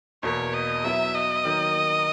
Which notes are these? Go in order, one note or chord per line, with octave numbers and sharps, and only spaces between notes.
E2 B2 A#3 C#5
D#5
F#3 B3 E4 E5
D#5
D#3 F#3 A#3